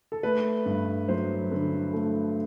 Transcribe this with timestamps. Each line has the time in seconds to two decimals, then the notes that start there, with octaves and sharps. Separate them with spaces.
0.12 A4
0.23 A3 B4
0.66 G2
1.08 F#3 C5
1.51 D3
1.93 A3